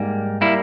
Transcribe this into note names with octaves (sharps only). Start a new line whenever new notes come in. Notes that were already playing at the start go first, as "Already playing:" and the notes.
Already playing: G#2 G3 A#3
G3 A#3 E4